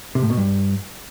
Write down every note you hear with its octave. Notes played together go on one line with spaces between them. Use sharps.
C3
A2
B2
G2